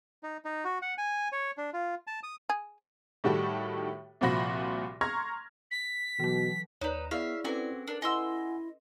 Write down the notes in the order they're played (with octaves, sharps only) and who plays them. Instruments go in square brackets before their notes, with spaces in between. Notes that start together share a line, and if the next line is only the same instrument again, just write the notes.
[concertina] D#4
D#4
F#4
F#5
G#5
C#5
D4
F4
A5
D#6
[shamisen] G#4
[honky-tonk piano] A2 D#3 G3 F#4 G4 A4
C2 A#2 F3 F#4 B5 A#6
A#5 C6 C#6 F6 G#6 A#6
[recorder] B6
[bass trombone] B2 [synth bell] E3 F#3
[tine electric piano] D#2 [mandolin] D#4 B4 [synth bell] C#5 D5
[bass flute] B3 [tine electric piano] E4 D5 [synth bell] G#4 [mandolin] E5 F5
[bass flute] C4 [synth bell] C#4 A4 B4 [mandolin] F#4 G#5
[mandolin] D4 [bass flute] A#4
[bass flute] E4 [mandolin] D#5 C6 E6 [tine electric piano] F#5 G#5